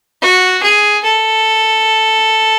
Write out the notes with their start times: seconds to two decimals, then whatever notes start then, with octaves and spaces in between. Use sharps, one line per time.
0.22 F#4
0.63 G#4
1.04 A4